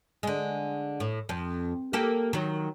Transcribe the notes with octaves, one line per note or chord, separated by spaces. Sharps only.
D3 G#3
A2
F2
A#3 G4 A4
D#3 F#3